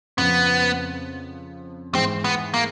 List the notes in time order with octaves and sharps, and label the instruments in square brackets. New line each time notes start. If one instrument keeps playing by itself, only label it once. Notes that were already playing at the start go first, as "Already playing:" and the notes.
[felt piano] F2 C#3 F3 [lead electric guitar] B3
[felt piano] G#2 E3 G#3 [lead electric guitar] C4
[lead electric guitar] B3
A#3